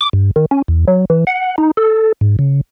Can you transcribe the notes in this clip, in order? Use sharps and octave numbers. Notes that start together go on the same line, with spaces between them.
D6
G2
D#3
C#4
E2
F#3
E3
F#5
D#4
A4
G#2
C#3